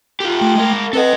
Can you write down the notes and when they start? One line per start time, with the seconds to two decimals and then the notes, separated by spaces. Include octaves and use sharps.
0.20 F4 G4
0.38 A3 G5
0.55 G#3 A#4
0.93 C4 A4 B4 D#5 F#5